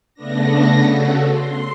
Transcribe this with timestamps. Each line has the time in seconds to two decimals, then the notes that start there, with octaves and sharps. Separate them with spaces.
0.14 C#3 A3 B3 D4 A#6
0.84 C#3 F#4 A4
1.30 C6